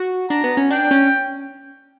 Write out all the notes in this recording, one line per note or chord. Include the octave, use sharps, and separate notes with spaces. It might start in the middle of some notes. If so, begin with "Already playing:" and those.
Already playing: F#4
D4 A#5
B3
C#4
D4 G5
C#4